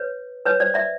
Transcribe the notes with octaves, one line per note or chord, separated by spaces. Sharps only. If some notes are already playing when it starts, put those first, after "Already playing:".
Already playing: B4 C#5
B4 C#5
C5 D5
D5 E5